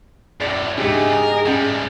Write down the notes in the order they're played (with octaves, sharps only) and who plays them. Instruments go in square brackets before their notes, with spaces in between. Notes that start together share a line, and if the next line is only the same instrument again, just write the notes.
[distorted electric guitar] F#2 A2 [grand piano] D5 A6
[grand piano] G#2 G4 [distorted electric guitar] C#3 A3 [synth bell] D4 [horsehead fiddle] G#4 D#5
[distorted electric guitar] A#4
[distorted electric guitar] A2 G3 [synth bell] C#4 F#5 G5